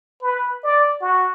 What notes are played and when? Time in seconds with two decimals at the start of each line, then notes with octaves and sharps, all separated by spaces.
0.22 B4
0.63 D5
1.01 F#4